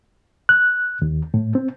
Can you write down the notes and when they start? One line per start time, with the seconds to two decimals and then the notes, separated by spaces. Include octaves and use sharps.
0.49 F#6
1.02 D#2
1.34 A2
1.55 C4